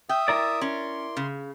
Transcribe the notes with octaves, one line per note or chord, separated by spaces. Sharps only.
E5 G5 D#6
E4 A#4 D5
C#4 C6
C#3